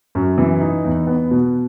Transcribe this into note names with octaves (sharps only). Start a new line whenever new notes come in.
F#2
E3
D#4
E2
B3
B2